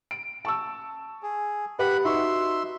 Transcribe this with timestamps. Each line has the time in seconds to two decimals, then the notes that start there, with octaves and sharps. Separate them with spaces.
0.11 D7
0.45 A5 C#6 E6
1.23 G#4
1.79 G4 B4 F#5 B5
2.05 D#4 F#4 E5 C6 C#6